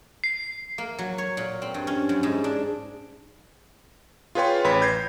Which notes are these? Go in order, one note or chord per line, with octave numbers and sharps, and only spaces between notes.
C7
A#3
F#3
C#5
A#2
C4
G2
C#4
F#2
G#2
D4
F4 G#4 B4 C#5 G5 C6
A1 B4 C#5 B5 B6
G6 G#6 A#6 C7